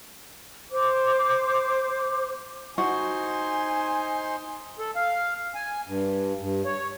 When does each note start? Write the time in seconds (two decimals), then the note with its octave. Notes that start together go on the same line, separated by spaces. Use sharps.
0.71 C5 D6
2.78 D#4 F#4 C5 G#5 C6
4.79 A4
4.96 F5
5.55 G#5
5.87 G2
6.39 G2
6.65 C#5